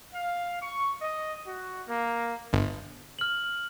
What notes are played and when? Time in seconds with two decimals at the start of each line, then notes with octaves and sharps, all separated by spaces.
0.15 F5
0.62 C#6
1.02 D#5
1.47 F#4
1.88 A#3
2.53 G1
3.19 F6 F#7